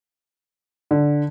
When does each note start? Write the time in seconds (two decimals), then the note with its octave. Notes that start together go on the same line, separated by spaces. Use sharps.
0.91 D3